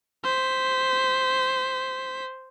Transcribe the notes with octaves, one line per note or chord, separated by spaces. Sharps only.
C5 B6